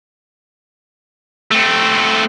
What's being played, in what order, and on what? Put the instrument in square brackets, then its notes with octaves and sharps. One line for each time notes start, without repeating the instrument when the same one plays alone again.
[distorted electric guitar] A3 C4